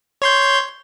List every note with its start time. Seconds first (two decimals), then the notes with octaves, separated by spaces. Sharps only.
0.22 C#5 C6 G6